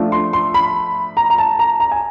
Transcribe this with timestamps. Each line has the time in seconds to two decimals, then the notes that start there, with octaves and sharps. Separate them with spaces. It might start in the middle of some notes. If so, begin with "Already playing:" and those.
Already playing: F3 A3 D4
0.12 C6
0.33 C6
0.54 B5
1.17 A#5
1.30 A#5
1.38 A5
1.59 A#5
1.80 A#5
1.92 G#5